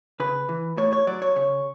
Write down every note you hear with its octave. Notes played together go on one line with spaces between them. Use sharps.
C#3 B4
E3
A2 C#5
C#5
F#3 D5
C#5
C#3 C#5